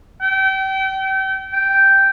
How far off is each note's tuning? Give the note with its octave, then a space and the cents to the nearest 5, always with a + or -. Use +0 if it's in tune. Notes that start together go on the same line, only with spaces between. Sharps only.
G5 -30
G5 -5